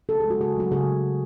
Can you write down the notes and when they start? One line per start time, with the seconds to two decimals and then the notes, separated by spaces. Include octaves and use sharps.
0.09 C#3 A4
0.20 G#3 G#4
0.30 F#4
0.40 C#3 G#4
0.56 F#3 A3 F#4
0.72 C#3 G#4